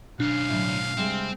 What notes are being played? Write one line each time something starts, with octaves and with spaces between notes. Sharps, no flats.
B1 C#4 D4 F5
A2 D3 F#3
C3 G3 G#3 C4